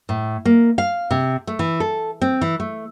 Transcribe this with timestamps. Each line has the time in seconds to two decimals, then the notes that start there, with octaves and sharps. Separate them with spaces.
0.09 A2
0.45 A#3
0.78 F5
1.11 C3
1.47 A3
1.59 E3
1.80 A4
2.21 C4
2.41 E3
2.60 A3